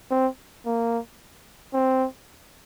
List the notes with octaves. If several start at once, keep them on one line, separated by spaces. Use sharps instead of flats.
C4
A#3
C4